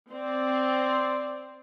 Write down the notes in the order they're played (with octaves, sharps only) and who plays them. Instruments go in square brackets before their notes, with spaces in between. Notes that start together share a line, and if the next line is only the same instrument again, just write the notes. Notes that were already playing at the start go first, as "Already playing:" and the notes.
[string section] C4 [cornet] D5